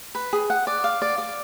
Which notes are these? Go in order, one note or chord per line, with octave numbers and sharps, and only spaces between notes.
B4
G#4
F#5
D5
F5
D5
D5